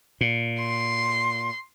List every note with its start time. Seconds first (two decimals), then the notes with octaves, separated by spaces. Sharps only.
0.21 A#2
0.60 C6